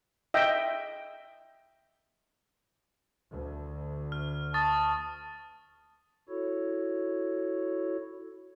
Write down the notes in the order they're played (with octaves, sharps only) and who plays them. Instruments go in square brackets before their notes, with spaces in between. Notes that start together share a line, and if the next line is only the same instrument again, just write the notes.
[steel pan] D#5 E5 G5
[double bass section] D2
[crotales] F6
[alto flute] A5 [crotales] C#6 D#6 A6
[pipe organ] E4 F#4 A4 C#5